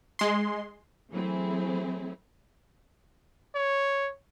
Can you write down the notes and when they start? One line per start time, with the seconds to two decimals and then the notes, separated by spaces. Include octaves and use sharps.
0.19 G#3 C6
1.12 E3 F#3 A3 C4 E4 G#4
3.55 C#5